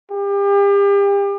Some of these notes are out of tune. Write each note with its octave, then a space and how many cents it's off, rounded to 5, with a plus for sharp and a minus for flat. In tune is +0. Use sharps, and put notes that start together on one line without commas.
G4 +35